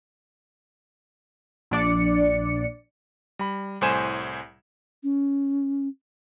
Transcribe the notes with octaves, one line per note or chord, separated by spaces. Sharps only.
A#1 D4 D5 C#7
G3 B5
C2 A2 C5 G#5 E7
C#4